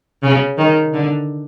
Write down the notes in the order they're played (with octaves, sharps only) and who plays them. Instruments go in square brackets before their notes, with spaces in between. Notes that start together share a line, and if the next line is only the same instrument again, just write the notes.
[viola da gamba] C#3
D#3
D3